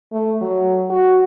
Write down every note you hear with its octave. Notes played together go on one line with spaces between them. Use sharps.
A3
F#3
F#4